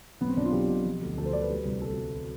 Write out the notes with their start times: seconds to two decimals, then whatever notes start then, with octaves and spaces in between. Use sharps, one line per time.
0.21 B1 B3
0.28 C4
0.37 B1 D4
0.45 F4
0.52 B1 G4
0.69 B2
0.85 F3
1.01 D2
1.18 D2 A4
1.25 C5
1.33 D3 D5
1.42 B4
1.49 G3
1.65 C2
1.82 G3 A4
1.98 G3